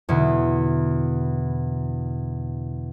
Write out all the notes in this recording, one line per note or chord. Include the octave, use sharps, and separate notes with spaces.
E2 B2 D3